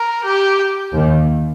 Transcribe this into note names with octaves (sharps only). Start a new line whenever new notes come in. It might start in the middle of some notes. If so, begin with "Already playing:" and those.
Already playing: A#4
G4
D#2 D#3